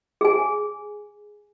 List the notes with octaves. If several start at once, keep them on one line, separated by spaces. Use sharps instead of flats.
G#4 G#5